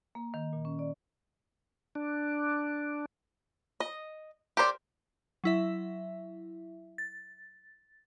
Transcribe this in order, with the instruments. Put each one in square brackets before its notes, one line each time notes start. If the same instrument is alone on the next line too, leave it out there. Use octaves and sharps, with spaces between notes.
[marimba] A#3
D#3
A#2
C#4
D5
[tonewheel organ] D4
[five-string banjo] D#5
G4 A#4 C5 D5
[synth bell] F#3 E4 E5
A6